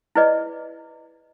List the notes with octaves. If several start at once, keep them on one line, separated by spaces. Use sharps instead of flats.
E4 G#4 B4 D5 D#5